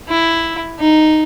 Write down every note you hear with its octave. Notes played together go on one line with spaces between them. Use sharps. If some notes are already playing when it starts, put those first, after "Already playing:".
E4
D#4